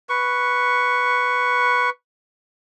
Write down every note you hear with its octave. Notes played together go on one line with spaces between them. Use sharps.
B4 C#6